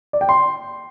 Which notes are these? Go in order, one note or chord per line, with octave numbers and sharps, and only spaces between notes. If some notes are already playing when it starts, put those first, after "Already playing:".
D5
G5
C6